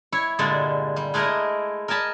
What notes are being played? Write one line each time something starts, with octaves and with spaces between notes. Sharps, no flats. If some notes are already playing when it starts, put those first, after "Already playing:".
E4 C#5
G2 A#2 D3 G#3 D5
G3
G#3 A3 E4 A#4 D#5
A#4 D#5 G#5 A5 B5